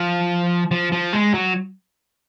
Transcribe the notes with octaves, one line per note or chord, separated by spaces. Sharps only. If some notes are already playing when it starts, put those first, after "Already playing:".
Already playing: F3
F3
F3
G#3
F#3